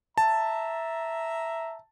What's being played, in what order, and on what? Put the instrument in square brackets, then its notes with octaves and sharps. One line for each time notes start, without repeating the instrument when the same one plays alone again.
[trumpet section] E5 A#5 [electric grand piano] A5